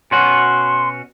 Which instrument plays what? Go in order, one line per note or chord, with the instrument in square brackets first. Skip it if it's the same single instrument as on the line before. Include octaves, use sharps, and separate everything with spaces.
[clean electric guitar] B2 C#4 F#4 [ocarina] C6